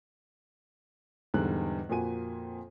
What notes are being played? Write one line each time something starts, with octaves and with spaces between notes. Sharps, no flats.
E2 G#2 D3 G3 F#6
F2 A#2 A#3 F#4 G#5 D#7